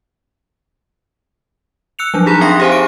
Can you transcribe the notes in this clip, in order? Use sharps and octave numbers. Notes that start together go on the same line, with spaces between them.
E6 F#6 C#7 F7
F3 F#3 D4
D#4 G4 G#4 A#5 B5
C4 E5 G5 C6 A#6 C7
G4 G#4 C5 E5 F5 G#5
D7